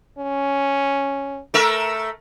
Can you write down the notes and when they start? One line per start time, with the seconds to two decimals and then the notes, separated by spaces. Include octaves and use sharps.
0.18 C#4
1.54 A3 A#4 E5